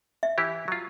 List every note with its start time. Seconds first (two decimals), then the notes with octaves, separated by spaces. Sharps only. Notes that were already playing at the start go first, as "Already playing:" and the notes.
0.23 E5
0.38 E3 E4 G4
0.68 F#3 F4